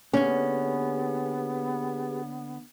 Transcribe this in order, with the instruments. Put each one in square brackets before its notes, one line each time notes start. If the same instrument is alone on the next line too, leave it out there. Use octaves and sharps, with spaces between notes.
[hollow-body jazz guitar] D3 A#3 G#5 [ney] B3 [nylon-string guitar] C#4 [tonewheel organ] G4 G#4 B4